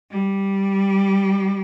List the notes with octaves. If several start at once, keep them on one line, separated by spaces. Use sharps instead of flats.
G3